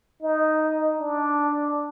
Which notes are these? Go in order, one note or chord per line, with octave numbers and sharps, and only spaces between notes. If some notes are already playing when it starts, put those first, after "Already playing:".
D#4
D4